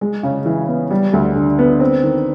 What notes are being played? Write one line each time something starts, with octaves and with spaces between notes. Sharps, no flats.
G#3
C#3
E3
B3
G3
D2
D3
B3
C4
D#3